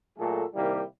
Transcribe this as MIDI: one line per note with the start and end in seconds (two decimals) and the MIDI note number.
0.18 0.43 46
0.18 0.43 54
0.18 0.43 57
0.18 0.43 66
0.18 0.43 68
0.18 0.43 69
0.55 0.82 48
0.55 0.82 51
0.55 0.82 55
0.55 0.82 58
0.55 0.82 64
0.55 0.82 67